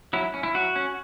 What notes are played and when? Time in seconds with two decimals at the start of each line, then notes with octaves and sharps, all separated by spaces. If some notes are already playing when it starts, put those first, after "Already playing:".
0.13 F#3 E4
0.34 C#4
0.43 E4
0.54 F#3 F#4
0.76 C#4